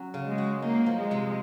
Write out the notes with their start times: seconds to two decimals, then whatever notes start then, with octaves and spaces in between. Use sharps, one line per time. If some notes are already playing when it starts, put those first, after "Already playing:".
Already playing: F#3 C#4
0.14 C#3
0.26 G#3
0.38 F#4
0.62 A#3 D#4
0.86 F3
0.98 G#3
1.11 C3